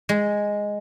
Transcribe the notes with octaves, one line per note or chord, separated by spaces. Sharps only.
G#3